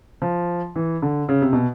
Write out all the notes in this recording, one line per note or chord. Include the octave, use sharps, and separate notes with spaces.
F3
E3
D3
C#3
C3
B2